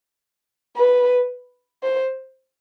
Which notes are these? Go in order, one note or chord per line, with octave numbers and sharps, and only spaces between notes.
B4
C5